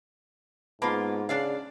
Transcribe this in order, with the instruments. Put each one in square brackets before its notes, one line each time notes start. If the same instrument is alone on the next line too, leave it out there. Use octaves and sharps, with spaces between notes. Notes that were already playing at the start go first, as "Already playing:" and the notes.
[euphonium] G#2 [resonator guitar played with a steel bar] A#3 F4 [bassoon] B3 [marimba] A5 B5 C6
[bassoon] C#3 [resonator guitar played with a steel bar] D4 D5 F5